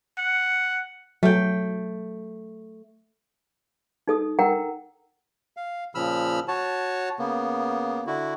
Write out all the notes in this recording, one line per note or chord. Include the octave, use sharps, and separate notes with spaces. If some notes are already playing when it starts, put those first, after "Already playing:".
F#5
F#3 A3 G5
D#4 A4 D#6
A#4 F#5 G5 A#5
F5
A#2 C#3 F3 B5 E6 F6
F#4 C#5 A5
C#3 A#3 B3
D3 E4 F#4